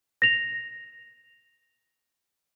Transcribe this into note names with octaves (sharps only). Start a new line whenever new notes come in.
A#6 F7